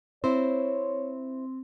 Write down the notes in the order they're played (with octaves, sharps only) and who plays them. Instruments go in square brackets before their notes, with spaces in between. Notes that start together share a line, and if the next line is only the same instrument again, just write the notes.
[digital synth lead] C4 [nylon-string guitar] E4 C5 [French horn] C#5